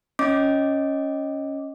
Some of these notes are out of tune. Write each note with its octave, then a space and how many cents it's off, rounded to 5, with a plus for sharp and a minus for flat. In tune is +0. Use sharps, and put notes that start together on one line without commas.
C#4 +0 D#5 +5 D6 +0